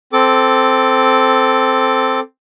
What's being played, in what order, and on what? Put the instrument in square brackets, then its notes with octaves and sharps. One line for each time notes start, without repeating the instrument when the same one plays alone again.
[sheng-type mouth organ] C4 A4 D6